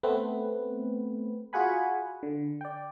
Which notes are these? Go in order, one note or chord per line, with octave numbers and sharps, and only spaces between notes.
A3 B3 C4 B4
F4 F#4 G#4 F#5 G#5 B5
D3
D5 G5